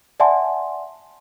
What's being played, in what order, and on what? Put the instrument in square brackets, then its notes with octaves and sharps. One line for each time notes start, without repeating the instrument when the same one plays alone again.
[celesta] D5 E5 F#5 G#5 A5 C6